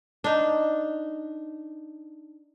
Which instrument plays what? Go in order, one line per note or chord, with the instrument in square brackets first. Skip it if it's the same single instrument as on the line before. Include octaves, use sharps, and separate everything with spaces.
[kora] D4 D#4